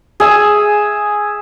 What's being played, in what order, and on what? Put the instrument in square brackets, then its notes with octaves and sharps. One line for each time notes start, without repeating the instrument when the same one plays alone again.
[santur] G#4 E5